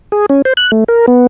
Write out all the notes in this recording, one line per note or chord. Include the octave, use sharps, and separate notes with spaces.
G#4
C#4
C5
F#6
A3
A#4
B3